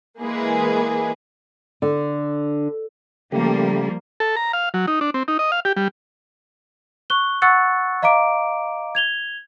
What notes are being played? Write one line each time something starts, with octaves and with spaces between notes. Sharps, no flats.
E3 G#3 A#3 G#4 B4
D3
C#3 F3 G3 A3 A#3 G4
A4
A#5
F5
F#3
D#4
D4
C4
D#4
D#5
F5
G4
G3
C#6 F#6 G7
F#5 C#6 E6 F#6 A6 C#7
D#5 F5 A#5 D6 D7
G#6 F7 G7